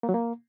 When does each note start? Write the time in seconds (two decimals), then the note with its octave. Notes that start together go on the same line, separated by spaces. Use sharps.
0.03 A#3
0.09 F#3
0.14 A#3